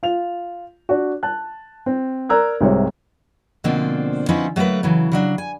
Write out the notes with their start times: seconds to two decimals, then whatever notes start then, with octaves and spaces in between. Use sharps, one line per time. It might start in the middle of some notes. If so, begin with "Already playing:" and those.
0.03 F4 F7
0.89 D4 F#4
1.23 A5 F#6
1.86 C4
2.29 A#4 D5 A#5 E6 F#6 G#6
2.61 C2 G#2 C3 C5 C#5
3.64 B2 D3 F3 A#3 C4 D4
4.29 F3 B3 C#4 D#4 E4 C5
4.56 F#3 A3 A#3 A#4 B4
4.83 C#3 E3 F#3
5.12 C#3 F#3 D4
5.38 G#5